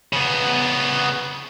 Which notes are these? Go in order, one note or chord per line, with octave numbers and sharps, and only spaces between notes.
C#3 B3